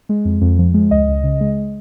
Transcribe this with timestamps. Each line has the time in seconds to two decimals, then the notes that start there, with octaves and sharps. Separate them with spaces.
0.09 G#3
0.25 F2
0.41 F2
0.58 F3
0.74 G#3
0.91 C#2 D#5
1.08 C#2
1.23 C#3
1.41 G#3